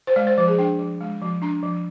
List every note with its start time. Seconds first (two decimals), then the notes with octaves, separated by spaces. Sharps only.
0.07 C5
0.16 G#3 D5
0.27 C5
0.38 F3 C5
0.48 G#4
0.58 D4 G5
0.79 F3
1.00 G#3
1.21 F3
1.42 D4 A#5
1.63 F3